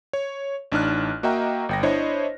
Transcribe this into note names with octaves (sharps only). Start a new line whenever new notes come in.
C#5
A1 D4 D#4 F6 F#6
A#3 F#4 D#5 E5 G5 A#5
G1 G5 A#6
D4 E4 C5 C#5 D#5